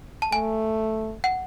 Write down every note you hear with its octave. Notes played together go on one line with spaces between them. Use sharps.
A5
A3 G#5
F#5